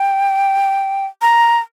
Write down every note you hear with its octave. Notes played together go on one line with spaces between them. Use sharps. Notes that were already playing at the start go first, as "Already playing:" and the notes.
Already playing: G5
A#5